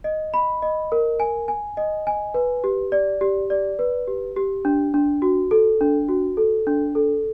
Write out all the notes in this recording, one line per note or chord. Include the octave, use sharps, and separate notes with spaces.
D#5
B5
D#5
A#4
G#5
G#5
D#5
G#5
B4
G4
D5
G4
D5
B4
G4
G4
D4
D4
F#4
A4
D4
F#4
A4
D4
A4